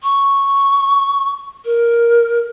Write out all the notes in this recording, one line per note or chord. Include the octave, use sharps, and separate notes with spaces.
C#6
A#4